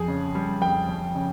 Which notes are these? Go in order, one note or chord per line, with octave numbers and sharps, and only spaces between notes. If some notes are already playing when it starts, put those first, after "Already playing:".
Already playing: F2 G#4
C#3
G3
F2 G5
F2
C#3